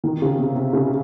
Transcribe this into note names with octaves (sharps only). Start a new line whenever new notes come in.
D#3
C#3
C3
C3
C#3